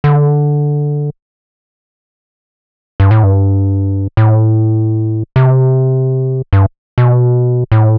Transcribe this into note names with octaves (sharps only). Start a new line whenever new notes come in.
D3
G2
A2
G2
A2
C3
G2
B2
A2